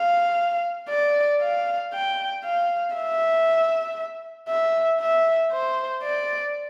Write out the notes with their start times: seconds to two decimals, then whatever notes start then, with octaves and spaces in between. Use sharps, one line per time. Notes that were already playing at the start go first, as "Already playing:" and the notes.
Already playing: F5
0.89 D5
1.42 F5
1.93 G5
2.45 F5
2.95 E5
4.49 E5
5.01 E5
5.52 C5
6.03 D5